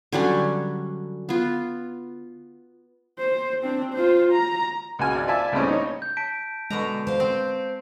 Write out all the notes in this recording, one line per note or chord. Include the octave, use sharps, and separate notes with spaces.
D3 F#3 G3 C#4
B3 F4
C5
C4 D4
F4 C5
A#5
C#2 F#4 G#5 F6
G#1 D5
F4 D5 E5 G#5 A5
C#2 A2 C#3 G3 C4 C#4
D#4 C#5
G6
A5 B6 D7
B2 D3 G#3 A#5
C5 F5
C4